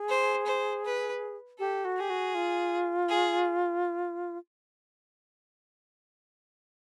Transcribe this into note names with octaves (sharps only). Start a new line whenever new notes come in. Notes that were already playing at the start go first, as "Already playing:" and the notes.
Already playing: G#4
C5
C5
B4
G4 A4
F#4
G4 G#4
F#4
F4
G#4